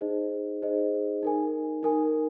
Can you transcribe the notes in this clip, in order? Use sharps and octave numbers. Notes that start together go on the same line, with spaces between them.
D#4 G#4 C5 D#5
D#4 G#4 C5 D#5
D#4 A#4 G#5
D#4 A#4 G#5